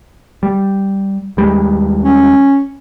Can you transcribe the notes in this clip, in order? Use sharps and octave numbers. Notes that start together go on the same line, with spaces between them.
G3
D#2 G3 G#3
C#4